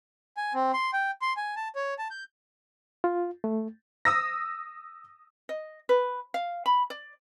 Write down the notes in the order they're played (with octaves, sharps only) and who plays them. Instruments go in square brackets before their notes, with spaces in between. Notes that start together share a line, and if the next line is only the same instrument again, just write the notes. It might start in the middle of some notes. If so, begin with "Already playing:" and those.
[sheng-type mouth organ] G#5
C4
C6
G5
C6
G#5
A5
C#5
A5
G6
[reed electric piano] F4
A3
[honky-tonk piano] D#6 E6 A#6
[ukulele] D#5
B4
F5
B5
D5